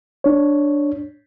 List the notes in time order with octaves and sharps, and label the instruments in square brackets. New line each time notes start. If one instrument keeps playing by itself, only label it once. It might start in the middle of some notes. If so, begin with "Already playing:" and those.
[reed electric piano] D4 C#5